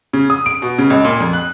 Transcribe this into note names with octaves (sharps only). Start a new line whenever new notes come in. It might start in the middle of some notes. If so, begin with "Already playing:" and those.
C#3
D#6
D7
B2
C#3
C#2
A#2
F2
F#6